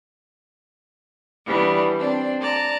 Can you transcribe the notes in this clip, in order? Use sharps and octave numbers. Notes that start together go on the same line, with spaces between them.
E3 G3 B3 D4
C4 D4
D5 A5 A#5